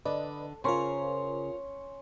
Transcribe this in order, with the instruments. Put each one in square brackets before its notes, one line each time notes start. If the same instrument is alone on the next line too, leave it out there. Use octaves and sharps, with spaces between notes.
[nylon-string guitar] D3 [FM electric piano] B4 D5 D#5
[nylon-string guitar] C#3 [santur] C#4 C6 C#6 [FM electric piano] F4 A#4 C5